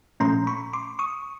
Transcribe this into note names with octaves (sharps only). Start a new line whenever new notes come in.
A#2 F3 A3 C#4 A#5 C6
B5 C#6
C6 D6
C#6 D#6